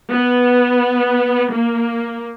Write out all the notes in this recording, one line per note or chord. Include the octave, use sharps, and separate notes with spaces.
B3
A#3